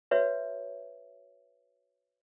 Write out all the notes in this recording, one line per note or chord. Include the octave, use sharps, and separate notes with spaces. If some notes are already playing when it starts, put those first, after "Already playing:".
F#4 B4 C#5 E5